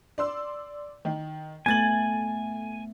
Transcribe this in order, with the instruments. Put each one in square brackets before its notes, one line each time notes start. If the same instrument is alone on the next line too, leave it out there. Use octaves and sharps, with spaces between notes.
[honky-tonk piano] D5 C6 E6
D#3
[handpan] A3 B3 [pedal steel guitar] G#5 [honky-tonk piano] G#6 A6 F#7